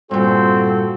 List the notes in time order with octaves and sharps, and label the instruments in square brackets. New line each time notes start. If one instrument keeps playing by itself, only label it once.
[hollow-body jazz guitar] G2 A#2 [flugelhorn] C4 [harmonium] F#4 A4